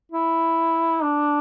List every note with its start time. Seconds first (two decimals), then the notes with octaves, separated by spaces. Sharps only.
0.12 E4
1.03 D4